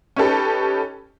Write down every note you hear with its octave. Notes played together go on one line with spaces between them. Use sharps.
C#4 D#4 G4 A4 B4